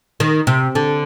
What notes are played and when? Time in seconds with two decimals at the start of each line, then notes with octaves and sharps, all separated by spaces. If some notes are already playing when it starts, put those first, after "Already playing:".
0.20 D#3
0.47 C3
0.75 D3